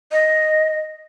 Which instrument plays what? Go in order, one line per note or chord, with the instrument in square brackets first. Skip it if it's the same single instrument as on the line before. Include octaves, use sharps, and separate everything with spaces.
[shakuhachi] D#5